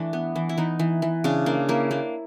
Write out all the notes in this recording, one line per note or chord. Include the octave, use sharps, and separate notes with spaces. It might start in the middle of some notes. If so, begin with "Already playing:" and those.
Already playing: E3 A3 D4
B3
E3
E4
E3 D#4
E3
E3
C#3 D4
A#3 D4
A#3 E4
A#3 D4